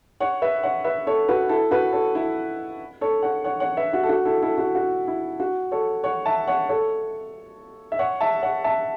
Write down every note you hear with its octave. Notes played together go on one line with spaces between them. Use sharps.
C#5 F#5
B4 E5
C#5 F#5
B4 E5
A4 C#5
F#4 B4
E4 A4
F#4 B4
A4 C#5
E4 A4
A4 C#5
C#5 F#5
C#5 F#5
C#5 F#5
B4 E5
F#4
A4
F#4
E4 A4
E4 A4
F#4
F#4
E4
F#4
A4 C#5
C#5 F#5
E5 A5
C#5 F#5
A4 C#5
E5
C#5 F#5
E5 A5
C#5 F#5
E5 A5